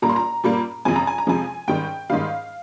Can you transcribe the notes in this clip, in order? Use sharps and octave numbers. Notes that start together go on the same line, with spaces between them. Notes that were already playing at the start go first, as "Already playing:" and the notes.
A#2 G3 A#3 A#5
C6
A#5
A#2 G3 A#3
F2 C3 F3 G#3 G#5
A#5
G#5
A#5
F2 C3 F3 G#3 G#5
G#2 D#3 G3 G5
G#2 D#3 G3 F5